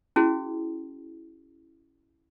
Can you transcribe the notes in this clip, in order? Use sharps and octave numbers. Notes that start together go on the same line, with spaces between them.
C#4 E4 F#4 G#4